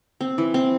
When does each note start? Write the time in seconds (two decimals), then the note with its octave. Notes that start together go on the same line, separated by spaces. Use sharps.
0.21 C4
0.38 E3
0.54 C4